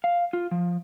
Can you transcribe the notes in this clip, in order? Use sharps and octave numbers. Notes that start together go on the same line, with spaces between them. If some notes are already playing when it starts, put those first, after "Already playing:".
F5
F4
F3